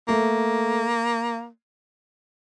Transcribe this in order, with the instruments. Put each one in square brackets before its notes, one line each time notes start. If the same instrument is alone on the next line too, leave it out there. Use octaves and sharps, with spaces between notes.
[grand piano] A3 [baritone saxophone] A#3